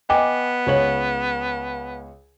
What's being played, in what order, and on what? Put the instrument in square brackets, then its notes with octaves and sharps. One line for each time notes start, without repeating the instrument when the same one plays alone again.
[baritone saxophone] B3 [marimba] D#5 G5 D6 [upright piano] G#5
[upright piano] C#2 C#5 F#7